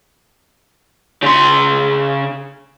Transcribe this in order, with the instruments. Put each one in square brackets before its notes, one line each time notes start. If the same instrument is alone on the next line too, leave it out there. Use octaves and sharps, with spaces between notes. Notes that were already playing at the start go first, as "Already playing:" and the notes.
[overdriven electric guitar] C#3 C6